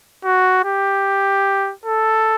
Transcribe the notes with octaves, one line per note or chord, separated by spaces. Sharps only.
F#4
G4
A4